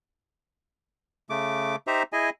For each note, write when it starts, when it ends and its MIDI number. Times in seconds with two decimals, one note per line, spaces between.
1.30 1.76 49
1.30 1.76 57
1.30 1.76 86
1.87 2.03 63
1.87 2.03 67
1.87 2.03 72
1.87 2.03 76
1.87 2.03 82
2.13 2.30 64
2.13 2.30 68
2.13 2.30 75
2.13 2.30 80